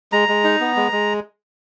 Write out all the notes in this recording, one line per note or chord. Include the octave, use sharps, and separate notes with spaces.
G#3 A#5
G#3
D#4
B3
G#3
G#3